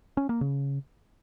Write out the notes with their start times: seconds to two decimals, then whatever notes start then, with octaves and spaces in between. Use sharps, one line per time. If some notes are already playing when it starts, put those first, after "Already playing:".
0.17 C#4
0.29 A#3
0.41 C#3